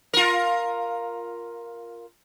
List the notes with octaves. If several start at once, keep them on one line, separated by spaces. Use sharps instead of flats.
F4 A#4